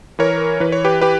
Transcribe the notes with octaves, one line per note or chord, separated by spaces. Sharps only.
E3 A#4 C#5
E3 B4
C#5
G4 B4
G4 B4